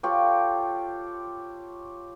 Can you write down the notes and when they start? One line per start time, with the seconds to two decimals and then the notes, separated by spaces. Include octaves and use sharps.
0.03 F4 G4 A4 C#5